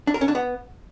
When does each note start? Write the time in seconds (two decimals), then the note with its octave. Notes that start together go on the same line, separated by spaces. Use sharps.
0.07 D4
0.14 A#4
0.21 C#4
0.28 D4
0.35 B3